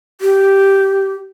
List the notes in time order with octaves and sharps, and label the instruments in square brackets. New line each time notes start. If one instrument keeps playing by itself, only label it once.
[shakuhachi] G4